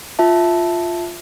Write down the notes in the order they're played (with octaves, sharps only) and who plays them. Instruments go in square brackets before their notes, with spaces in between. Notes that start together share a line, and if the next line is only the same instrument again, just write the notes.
[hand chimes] F4 E5 A5